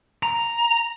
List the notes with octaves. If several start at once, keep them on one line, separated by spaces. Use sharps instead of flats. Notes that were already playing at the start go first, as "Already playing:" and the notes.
A#5